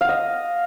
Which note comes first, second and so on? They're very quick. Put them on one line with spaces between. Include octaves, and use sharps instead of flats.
F5 F#5 D#5